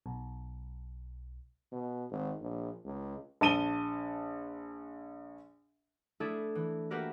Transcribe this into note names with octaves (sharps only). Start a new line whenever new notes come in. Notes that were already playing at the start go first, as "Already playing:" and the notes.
B1
B2
G#1
A#1
C#2
A#1 A5 D#7 G7
A3 D4 E4 G#4 A4
E3
A#3 F#4 G4 A#4 B4 E5